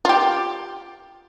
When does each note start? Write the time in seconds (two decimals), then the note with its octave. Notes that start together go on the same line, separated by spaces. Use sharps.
0.05 F4 G4